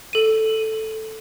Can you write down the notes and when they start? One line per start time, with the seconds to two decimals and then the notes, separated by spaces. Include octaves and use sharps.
0.13 A4 D#7